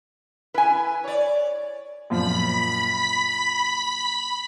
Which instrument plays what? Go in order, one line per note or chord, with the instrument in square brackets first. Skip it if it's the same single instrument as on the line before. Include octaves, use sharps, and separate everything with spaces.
[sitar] E4 [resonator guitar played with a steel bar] B4 G#5
[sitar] C#5 D5
[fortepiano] F#2 A#2 F3 [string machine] B5 B6